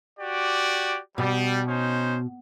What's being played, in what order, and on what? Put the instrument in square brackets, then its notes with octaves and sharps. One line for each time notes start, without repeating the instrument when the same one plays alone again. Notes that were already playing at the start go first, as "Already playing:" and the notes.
[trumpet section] F#4 G4 D5
[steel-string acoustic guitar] B2 [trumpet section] G3
[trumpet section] C#4 D#4 C5